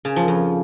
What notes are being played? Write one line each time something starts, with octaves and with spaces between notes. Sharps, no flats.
C#3
F3
F2